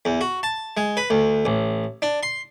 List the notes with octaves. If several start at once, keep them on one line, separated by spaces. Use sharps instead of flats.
E2
F#4
A5
G#3
B4
D2
A1
D4
C6